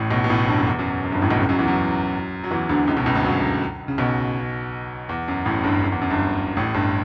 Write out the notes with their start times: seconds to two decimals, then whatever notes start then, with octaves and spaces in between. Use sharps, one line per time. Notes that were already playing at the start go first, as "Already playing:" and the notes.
Already playing: A1 A2
0.11 B1 B2
0.24 B2
0.29 A1 A2
0.48 G1 G2
0.58 F#2
0.67 E2
0.79 F#2
0.91 F#2
1.04 F#2
1.12 G1 G2
1.22 A1 A2
1.31 B1 B2
1.40 C#2 C#3
1.49 F#2 F#3
1.58 E2 E3
1.68 F#2 F#3
2.44 F#3
2.51 E2 E3
2.69 D2 D3
2.87 C#2 C#3
2.97 B1 B2
3.06 C#2 C#3
3.15 D2 D3
3.24 F#2 F#3
3.88 C#3
3.98 B1 B2
5.09 E2
5.28 F#2
5.46 A1 A2
5.64 G1 G2
5.83 F#2
5.92 E2
6.01 F#2
6.10 G1 G2
6.57 A1 A2
6.74 G1 G2